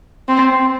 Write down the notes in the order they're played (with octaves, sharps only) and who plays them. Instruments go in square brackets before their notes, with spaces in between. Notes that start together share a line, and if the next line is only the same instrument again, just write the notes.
[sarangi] C4